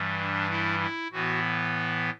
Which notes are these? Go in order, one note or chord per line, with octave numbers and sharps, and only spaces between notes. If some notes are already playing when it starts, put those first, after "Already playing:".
Already playing: G2 E3 G3
D4
E4
E4
A2 E3 B3 F#4